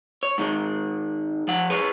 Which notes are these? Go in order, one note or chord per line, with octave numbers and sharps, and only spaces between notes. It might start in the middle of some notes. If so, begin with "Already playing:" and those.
C#5
G#2 D#3 G#3
F3 F#5
G#4 B4 C#5